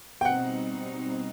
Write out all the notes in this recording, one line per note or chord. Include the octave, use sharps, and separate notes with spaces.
G5
B2 G3 C4 D#4 F#5